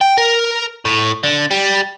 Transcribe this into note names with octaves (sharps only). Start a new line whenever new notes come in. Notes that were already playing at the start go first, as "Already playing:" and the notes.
G5
A#4
A2
D3
G3